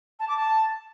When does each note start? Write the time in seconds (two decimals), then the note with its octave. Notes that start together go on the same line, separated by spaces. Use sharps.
0.19 A5
0.28 D6
0.37 A5